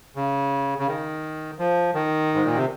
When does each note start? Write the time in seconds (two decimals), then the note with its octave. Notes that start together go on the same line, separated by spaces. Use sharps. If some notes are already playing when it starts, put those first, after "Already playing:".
0.16 C#3
0.78 C#3
0.87 D#3
1.59 F3
1.94 D#3
2.34 G#2
2.45 A#2
2.55 C3